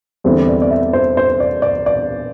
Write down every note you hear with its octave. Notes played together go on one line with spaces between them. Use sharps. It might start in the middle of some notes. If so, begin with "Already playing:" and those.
E2 D3 G3 C4 E4 C5
D5
D5
E5
C5
C5
D5
D5
D5